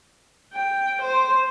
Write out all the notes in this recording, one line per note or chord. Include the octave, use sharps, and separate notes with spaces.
G5
C5